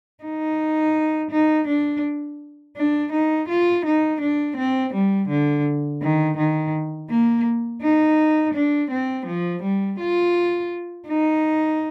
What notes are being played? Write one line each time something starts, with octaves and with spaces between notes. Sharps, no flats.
D#4
D#4
D4
D4
D#4
F4
D#4
D4
C4
G3
D3
D#3
D#3
A#3
D#4
D4
C4
F3
G3
F4
D#4